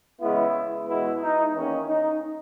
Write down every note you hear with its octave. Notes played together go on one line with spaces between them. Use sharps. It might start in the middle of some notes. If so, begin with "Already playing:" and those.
E2 C#3 G#3 B3 E4
E2 B2 G#3 B3 E4
D#4
E2 D#3 A#3 C#4
D#4